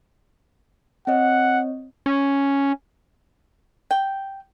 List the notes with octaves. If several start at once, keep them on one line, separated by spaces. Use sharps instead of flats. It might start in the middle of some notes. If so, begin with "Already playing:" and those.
C4 C#5 D#5 F#5
C#4
G5